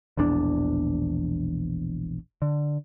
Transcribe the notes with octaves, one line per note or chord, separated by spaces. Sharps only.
E1 A#1 E2 D4
D3